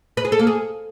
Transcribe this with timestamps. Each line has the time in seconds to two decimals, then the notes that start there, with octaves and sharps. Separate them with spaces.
0.17 B4
0.25 G#4
0.32 A4
0.39 A#3
0.47 G#4